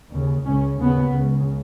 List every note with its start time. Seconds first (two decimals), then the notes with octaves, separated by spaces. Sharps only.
0.12 D#2 C#3
0.46 C#2 C#3 C#4
0.81 D#2 C#3 B3
1.15 C#2 C#3